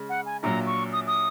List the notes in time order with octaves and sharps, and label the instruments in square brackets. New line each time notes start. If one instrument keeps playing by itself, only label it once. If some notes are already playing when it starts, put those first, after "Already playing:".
Already playing: [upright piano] C#3 G#3
[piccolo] F#5
G#5
[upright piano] A#1 A#2 F#3 [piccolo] A#5
[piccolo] C#6
D#6
D#6